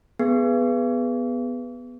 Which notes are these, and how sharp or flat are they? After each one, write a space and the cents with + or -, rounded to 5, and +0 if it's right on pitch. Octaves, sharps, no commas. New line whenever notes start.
B3 +0 G#4 +0